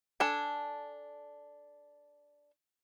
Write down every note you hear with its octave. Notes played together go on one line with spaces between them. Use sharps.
D4 A4 G#5 A5